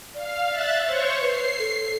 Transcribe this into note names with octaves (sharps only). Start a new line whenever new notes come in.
D5 F5
E5 F#6 A6
C5 C#5 C#6
B4 C7
A4